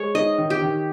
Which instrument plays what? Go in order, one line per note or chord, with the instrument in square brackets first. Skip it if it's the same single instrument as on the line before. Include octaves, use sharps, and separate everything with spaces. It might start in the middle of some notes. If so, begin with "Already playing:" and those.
Already playing: [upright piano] G#3 [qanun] C#5
[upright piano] D#4 [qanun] D#5
[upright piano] D#3
[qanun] G4
[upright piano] D#3